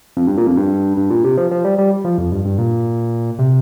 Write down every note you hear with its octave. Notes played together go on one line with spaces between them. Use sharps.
F2
G2
A#2
F2
G2
G2
A#2
C3
F3
F3
G3
G3
F3
F2
G2
G2
A#2
C3